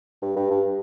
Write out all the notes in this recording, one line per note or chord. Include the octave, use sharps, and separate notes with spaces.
G2
G2
G2